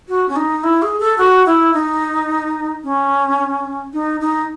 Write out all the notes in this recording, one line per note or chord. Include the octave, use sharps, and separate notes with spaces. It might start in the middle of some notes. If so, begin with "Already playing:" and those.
F#4
C#4
D#4
E4
G#4
A4
F#4
E4
D#4
C#4
D#4
D#4